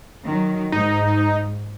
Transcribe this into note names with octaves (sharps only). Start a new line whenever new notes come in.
D#3 F#3
G#2 D#4